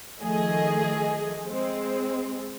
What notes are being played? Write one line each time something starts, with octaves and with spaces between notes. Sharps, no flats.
D#3 F3 A3 G#4 D#5
G#3 C4